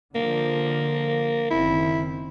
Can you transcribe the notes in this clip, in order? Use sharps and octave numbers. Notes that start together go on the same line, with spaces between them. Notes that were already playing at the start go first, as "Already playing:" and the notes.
D3 F3 A#3
F#1 D#3 C4 E4